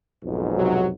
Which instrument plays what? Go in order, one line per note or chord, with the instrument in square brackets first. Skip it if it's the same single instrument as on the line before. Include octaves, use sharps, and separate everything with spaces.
[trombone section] B1 F2 G#2
[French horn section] C3 F#3